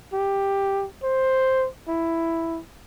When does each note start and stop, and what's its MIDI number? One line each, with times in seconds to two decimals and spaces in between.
0.13 0.86 67
1.03 1.67 72
1.88 2.61 64